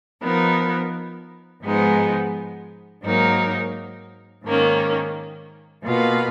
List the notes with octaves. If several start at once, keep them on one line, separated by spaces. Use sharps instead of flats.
F3 B3 D#4 A#4
G#2 F3 G#3 B3 D#4
G#2 F#3 A#3 D#4 A#4
G#2 D#3 A#3 C#4
B2 A#3 F4 B4 F5